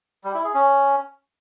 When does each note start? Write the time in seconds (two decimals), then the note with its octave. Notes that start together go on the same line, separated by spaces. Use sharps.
0.24 G3
0.34 E4
0.44 G#4
0.54 C#4